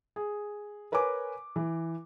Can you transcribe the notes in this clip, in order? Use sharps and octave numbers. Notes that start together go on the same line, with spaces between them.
G#4
A#4 B4 C#5 G#5 D6
E3